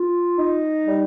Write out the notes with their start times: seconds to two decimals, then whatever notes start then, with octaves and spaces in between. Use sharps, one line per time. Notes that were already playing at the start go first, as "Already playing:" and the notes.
Already playing: F4
0.37 D#4
0.84 G3